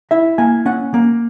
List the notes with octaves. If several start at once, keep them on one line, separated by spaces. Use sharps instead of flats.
E4 E5
A#3 G#5
C#4 F#5
A#3